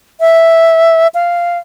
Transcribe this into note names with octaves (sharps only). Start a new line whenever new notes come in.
E5
F5